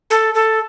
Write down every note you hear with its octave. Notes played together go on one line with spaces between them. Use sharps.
A4
A4